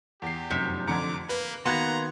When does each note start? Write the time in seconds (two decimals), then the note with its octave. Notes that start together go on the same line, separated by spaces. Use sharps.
0.22 E2 G4 C7
0.50 F1 F#2 C3 B6
0.87 F2 D3 A#5 D6 G#6 C#7
1.29 A#3 B4
1.65 D#3 A#3 B3 F#4 A#5 C6 F#6 G#6